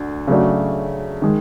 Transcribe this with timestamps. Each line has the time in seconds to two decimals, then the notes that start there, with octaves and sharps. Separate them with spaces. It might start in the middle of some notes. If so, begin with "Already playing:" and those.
Already playing: D2 D3
0.27 C#3 F#3 A3 D4
1.22 D#3 G#3